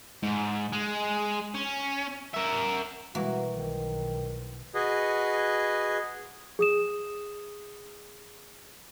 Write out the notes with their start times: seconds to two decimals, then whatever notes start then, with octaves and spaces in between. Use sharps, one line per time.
0.23 G#2
0.73 G#3
1.54 C#4
2.34 A#4 E5
3.15 B2 E3 G3 G#3 A#3 F#4
3.52 B1 D#3
4.74 F#4 G#4 B4 D#5
6.59 G#4 D#6 E7